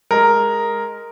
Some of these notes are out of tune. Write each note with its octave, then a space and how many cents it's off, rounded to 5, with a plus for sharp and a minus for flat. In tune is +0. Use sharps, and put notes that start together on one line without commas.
G#3 +0 A#4 +0